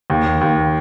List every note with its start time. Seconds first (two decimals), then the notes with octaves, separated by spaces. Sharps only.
0.10 D#2
0.41 D#2